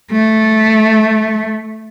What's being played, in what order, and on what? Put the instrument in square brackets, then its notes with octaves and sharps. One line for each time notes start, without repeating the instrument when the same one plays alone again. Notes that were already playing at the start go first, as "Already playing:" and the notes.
[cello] A3